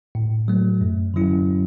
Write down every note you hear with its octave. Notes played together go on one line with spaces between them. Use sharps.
A2
F#3 A3
F#2
D3 F#3 C#4 E4